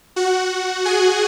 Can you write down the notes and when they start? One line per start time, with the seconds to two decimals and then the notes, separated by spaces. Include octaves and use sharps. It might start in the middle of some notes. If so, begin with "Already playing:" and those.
0.16 F#4 F#5
0.85 G#4 G#5